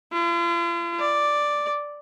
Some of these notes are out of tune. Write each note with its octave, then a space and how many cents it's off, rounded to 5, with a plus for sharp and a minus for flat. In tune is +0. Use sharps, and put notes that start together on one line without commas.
F4 -45
D5 +0